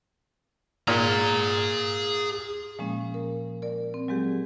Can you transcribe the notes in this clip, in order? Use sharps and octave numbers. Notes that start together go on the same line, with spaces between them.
A#2 G#4 A#5
A#2 F3 G#3 A#3 C#4
A#4
A#4 D5
C4
F#3 G#3 C4 G4 G#4